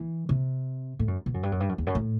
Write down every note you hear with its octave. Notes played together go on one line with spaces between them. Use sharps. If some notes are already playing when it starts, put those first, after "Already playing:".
Already playing: E3
C3
A2
F#2
B2
F#2
G2
F#2
G2
F#2
E2
F#2
A2